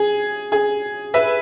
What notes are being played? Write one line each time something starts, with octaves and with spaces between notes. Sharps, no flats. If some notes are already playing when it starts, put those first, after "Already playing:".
Already playing: G#4
G#4
B4 E5